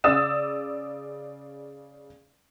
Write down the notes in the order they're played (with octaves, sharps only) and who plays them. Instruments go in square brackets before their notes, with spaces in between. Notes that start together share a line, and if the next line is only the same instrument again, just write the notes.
[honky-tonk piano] C#3 D5 D#6 E6 A6 E7